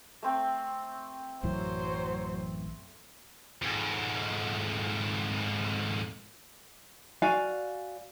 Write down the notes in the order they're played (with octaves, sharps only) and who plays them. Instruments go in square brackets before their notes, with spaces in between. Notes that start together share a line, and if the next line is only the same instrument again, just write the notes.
[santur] A3 C4 G5
[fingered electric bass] A1 F#2 E3 [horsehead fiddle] F#3 C5
[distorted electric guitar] F2 G#2
[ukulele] F#4 D5 F5 G#5